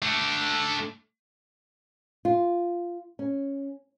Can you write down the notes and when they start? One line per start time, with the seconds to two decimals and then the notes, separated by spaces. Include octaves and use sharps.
0.02 A3 D4
2.25 F4
3.19 C#4